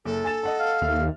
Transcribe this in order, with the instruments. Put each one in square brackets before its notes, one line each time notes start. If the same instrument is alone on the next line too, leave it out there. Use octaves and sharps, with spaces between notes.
[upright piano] F#1 [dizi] A4
[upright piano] G#5 A6 E7
D#5 F#5 A5
[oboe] F5
[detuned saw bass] D#2 [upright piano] E5 F6